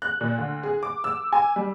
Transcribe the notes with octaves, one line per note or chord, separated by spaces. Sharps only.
F#6
A#2
D2
G#4
D6
E6
G#5
G3